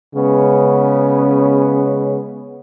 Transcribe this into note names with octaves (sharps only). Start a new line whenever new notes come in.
C#3 G#3 B3 C#4